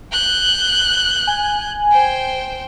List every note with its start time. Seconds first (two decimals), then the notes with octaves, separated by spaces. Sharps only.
0.12 F#6 G6
1.27 G#5
1.92 C5 G5